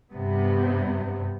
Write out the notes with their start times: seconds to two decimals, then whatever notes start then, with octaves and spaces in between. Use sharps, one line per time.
0.13 G2 C3 B3